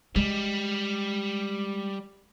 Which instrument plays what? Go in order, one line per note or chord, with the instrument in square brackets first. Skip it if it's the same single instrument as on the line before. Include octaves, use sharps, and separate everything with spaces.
[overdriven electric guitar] G3 [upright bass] G#3